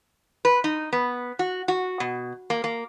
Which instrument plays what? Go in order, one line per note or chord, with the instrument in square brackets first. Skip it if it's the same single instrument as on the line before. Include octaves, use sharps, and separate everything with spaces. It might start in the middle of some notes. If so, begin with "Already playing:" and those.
[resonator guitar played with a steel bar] B4
D#4
B3
F#4
F#4
B2
A#3
A#3